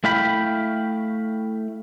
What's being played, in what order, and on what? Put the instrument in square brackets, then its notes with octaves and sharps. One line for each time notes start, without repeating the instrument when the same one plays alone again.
[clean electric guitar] A3 E4 F5 G5 B5